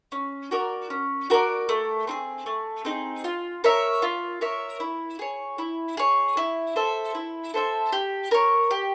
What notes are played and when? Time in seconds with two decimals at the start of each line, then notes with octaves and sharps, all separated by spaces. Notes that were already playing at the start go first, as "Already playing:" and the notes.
0.12 C#4
0.51 F#4 A#4 D5
0.90 C#4
1.30 F#4 A#4 D5
1.69 A3
2.07 C4 D#4 G#4
2.46 A3
2.85 C4 D#4 G#4
3.24 F4
3.64 A#4 C#5 E5
4.02 F4
4.41 A#4 C#5 E5
4.80 E4
5.19 G#4 C#5
5.58 E4
5.97 G#4 C#5
6.37 E4
6.76 A4 C5 E5
7.15 E4
7.54 A4 C5 E5
7.92 G4
8.31 A#4 C#5
8.71 G4